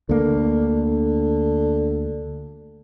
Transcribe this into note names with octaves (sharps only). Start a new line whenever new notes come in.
D2 D3 A#3